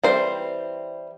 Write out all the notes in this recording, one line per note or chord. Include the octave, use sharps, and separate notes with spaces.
E3 G3 C4 C5